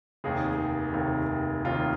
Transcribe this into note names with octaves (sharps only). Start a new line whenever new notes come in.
F1 D#2 D#3 G#4
F1 D#2 D#3
F1 D#2 D#3 F4